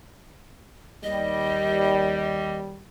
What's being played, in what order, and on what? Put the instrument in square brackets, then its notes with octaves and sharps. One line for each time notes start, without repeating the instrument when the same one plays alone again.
[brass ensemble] D#2 G3 [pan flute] D#5